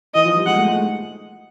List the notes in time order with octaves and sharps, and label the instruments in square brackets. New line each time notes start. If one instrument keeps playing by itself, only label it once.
[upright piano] E3 [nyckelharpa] D#5
[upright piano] F3
G3
[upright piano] G#3 [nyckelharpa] F#5
[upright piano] A3
G#3